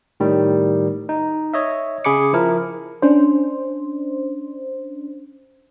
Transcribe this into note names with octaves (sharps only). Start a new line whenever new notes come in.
A2 D#3 G3
D#4
C#5 D#5 E5
C#3 G#4 B5 D6 C#7
F3 E4 A#4
C#4 D4 C5